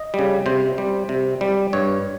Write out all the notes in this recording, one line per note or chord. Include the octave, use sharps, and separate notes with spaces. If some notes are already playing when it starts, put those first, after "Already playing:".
Already playing: D#5
C#3 G3
C3 C5
G3
C3
G3
G2 C#5